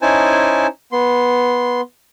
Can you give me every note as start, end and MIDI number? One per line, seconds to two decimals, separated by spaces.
0.02 0.67 61
0.02 0.67 63
0.02 0.67 64
0.02 0.67 72
0.02 0.67 80
0.02 0.67 81
0.92 1.81 59
0.92 1.81 84